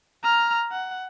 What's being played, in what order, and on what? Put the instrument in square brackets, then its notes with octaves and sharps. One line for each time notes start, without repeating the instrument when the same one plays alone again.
[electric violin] A#5 F6
F#5